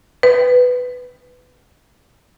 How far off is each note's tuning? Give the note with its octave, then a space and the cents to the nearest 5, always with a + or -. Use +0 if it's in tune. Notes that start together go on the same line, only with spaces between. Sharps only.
B4 +10